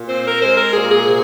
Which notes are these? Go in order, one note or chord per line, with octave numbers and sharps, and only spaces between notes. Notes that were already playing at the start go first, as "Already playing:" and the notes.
Already playing: A#2
C4 C5
A#4
G#3 C5
A#4
A#2 G#4
G#4
C3 G#4